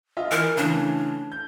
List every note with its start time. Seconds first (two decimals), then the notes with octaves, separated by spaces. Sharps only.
0.17 F4 D#5 E5
0.31 E3 A#4
0.57 C#3 E3 A3 D4
1.32 G6